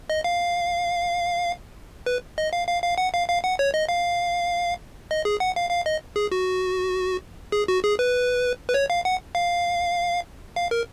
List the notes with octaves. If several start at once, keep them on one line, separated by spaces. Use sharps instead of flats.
D#5
F5
B4
D#5
F5
F5
F5
F#5
F5
F5
F#5
C#5
D#5
F5
D#5
G#4
F#5
F5
F5
D#5
G#4
F#4
G#4
F#4
G#4
B4
B4
C#5
F5
F#5
F5
F5
A#4